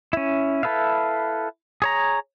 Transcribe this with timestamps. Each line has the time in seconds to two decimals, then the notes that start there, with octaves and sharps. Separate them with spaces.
0.13 C#4 E4
0.63 E4 A4 B4 E5 F5
1.82 G#4 C#5 A#5